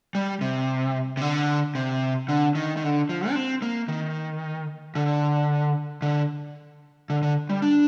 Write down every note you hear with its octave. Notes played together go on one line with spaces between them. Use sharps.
G3
C3
C3
D3
C3
D3
D#3
D#3
D3
F3
D4
C4
A#3
D#3
D3
D3
D3
D3
G3
D4